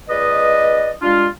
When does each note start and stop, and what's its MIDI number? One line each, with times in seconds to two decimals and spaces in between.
0.09 0.91 37
0.09 0.91 71
0.09 0.91 74
0.09 0.91 75
1.02 1.26 55
1.02 1.26 56
1.02 1.26 62
1.02 1.26 65